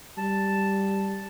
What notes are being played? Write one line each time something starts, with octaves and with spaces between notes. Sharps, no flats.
G3 A5